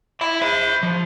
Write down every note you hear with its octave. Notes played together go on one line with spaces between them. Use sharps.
E5 B5
C5 B5
F3